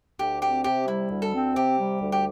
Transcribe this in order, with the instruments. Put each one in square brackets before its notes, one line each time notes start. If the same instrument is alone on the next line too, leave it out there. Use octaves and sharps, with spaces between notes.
[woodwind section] D2 [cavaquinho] G4
[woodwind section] C4 [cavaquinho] G4
[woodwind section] C3 [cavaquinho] G4
[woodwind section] G3 [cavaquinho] E4
[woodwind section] D2
[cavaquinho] A4
[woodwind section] C4
[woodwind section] C3 [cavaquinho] G4
[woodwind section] G3
D2
[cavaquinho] G4